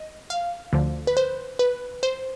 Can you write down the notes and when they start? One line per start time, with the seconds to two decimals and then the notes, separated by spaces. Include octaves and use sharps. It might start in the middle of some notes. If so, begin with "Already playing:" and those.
Already playing: D#5
0.30 F5
0.73 D2 D3 F3
1.07 B4
1.17 C5
1.59 B4
2.03 C5